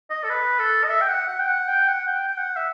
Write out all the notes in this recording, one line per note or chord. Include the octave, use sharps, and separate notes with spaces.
D#5
A4
B4
A4
D#5
E5
G5
F#5
F#5
G5
F#5
G5
F#5
G5
G5
F#5
E5